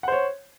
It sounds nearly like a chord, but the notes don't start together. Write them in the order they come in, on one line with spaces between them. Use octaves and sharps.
F#5 C5 C#5